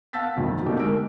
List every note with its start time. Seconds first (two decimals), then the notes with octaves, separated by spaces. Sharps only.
0.13 F5 F#5 A5 E6 A6 B6
0.37 A#1 F2 D#3 F#3
0.66 D3 A3 A#3 D#4 G4
0.79 G#3 A#4 E6 D7